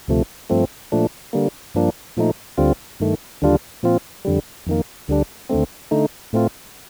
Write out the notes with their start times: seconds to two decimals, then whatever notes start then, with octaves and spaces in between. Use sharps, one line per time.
0.08 D2 C3 F3 A3
0.50 G2 F3 A3 C4
0.92 A#2 F3 A3 D4
1.33 D3 G3 A#3
1.75 G2 F3 A#3 D4
2.17 A#2 F3 A3 D#4
2.57 D2 D3 G3 C4 F4
3.00 G2 D#3 A3
3.42 D#2 D3 G3 D4 F4
3.83 A#2 F3 C4 F4
4.25 F2 D3 G3
4.67 F2 D#3 A#3
5.08 D2 D3 G3 D4
5.49 D#2 D3 A3 C4
5.91 D3 A3 D#4
6.33 A2 A3 C4 F4